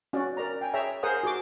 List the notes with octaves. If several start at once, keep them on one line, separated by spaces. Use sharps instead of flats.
C#4 F#4 D5
A#4 D5 A#5
G5 G#5
G#4 C#5 E5 G5 A#5
G#4 A#4 C5 F#5 G#5 D#6
F#4 G#4 D6